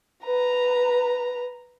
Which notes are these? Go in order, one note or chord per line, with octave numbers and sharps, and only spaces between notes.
B4 A#5